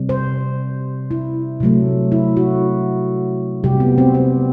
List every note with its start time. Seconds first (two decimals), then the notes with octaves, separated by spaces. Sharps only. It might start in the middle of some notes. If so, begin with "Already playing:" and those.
Already playing: C3 G3
0.09 C5
1.11 E4
1.60 C3 F#3 A3
2.12 E4
2.37 F#4
3.64 C3 G3 G4
3.80 B3
3.98 C4
4.14 C4